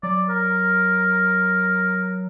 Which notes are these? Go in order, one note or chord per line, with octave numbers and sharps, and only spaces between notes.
F#3 D5
A#4